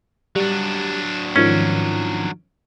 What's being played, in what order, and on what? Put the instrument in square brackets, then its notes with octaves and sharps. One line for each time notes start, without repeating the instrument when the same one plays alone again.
[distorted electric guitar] F#3 D4 [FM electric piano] G3
[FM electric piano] G#2 D#3 F3 [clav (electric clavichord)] C#4